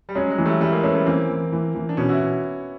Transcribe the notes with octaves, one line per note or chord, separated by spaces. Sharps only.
G3
F#3 G#3 C#4
F#3 G#3
E3
G3 A3
E3 G3 A3
G#3 A#3
A3 B3 C#4
G3 A3
E3 A#3 C4
E3
E3
E3
D4
B2 B3 C#4
E4 F#4
B2